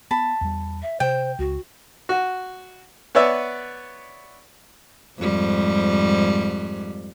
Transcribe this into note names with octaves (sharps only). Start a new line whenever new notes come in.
B3 A5 B5
E2 G3
E5
C3 C5 G5
C#2 F#4
F#4
B3 B4 C#5 D5 E5
F2 G#2 G3